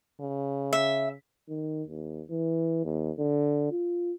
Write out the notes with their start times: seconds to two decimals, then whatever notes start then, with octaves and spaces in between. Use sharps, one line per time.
0.20 C#3
0.73 E5
1.49 D#3
1.88 D#2
2.30 E3
2.85 D#2
3.19 D3
3.71 F4